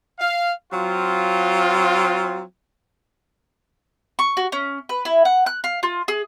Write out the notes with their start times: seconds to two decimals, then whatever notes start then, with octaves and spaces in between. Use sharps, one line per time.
0.19 F5
0.72 F#3 C4 F4
4.19 C#6
4.37 F#4
4.52 C#4
4.89 B4
5.05 E4
5.25 F#5
5.46 F#6
5.64 F5
5.83 F4
6.08 G#4